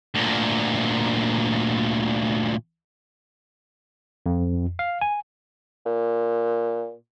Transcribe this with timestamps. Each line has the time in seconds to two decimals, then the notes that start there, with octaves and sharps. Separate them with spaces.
0.14 D2 A#2
4.26 F2
4.79 F5
5.01 G#5
5.86 A#2